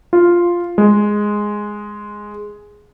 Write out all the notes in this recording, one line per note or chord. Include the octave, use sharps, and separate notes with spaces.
F4
G#3